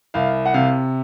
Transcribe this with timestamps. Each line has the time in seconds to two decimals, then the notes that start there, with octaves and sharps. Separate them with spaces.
0.14 C2 F5
0.46 F#5
0.54 C3 F5